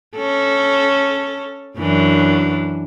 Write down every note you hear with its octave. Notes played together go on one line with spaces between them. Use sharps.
C#4 A4
F#2 E3 D4